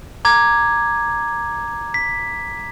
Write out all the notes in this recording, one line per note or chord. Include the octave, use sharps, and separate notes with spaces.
A#5 D6 G#6
B6